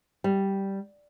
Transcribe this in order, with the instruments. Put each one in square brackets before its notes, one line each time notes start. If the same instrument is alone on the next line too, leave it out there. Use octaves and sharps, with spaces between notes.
[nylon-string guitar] G3